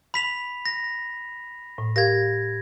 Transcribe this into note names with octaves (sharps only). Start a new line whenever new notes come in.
B5 B6 F7
A#6
A2
G4 A#4 F5 G#6 A#6